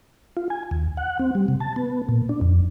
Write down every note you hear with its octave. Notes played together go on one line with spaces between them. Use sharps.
F4
G#5
D#2
F#5
C4
G3
C3
A5
B3
A#2
D4
F2